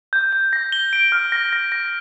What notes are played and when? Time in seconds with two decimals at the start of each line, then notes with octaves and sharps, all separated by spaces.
0.13 G6
0.33 G6
0.53 A#6
0.72 G7
0.93 D7
1.12 F6
1.32 A#6
1.53 A#6
1.72 A#6